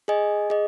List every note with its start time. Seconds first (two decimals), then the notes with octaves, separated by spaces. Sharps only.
0.08 G#4 D#5 G#5
0.50 G#4 D#5